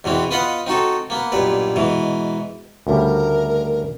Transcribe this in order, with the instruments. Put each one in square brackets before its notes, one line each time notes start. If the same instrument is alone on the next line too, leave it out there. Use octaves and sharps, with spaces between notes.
[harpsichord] E2 B2 E3 C4
B3 F4 B4 D#5 F#5
C4 D#4 F#4 A4
A#3 B3
B1 G2 A#2 B4
G#2 B2 E3
[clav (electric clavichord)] D2 C#3 G3 [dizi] A#4